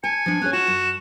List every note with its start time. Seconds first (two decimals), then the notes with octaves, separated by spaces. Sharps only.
0.04 G#5 A5 C#7
0.26 F3 D4
0.42 C#4 G#4 C#5 F#6
0.53 F4 F#4 E7
0.67 F#2